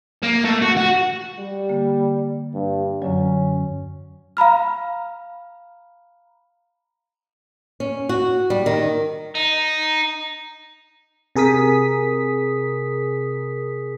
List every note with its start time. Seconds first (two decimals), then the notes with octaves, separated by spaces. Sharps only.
0.23 A#3
0.45 A3
0.62 F#4
0.77 F#4
1.38 G3
1.69 D3 A#3
2.54 G2
3.02 F#2 D3 F#3 C#4
4.37 F5 A#5 B5 F6
7.80 C#4
8.09 F#4
8.50 G3
8.66 D#3
9.35 D#4
11.36 C3 G#4 A#4 D#6 B6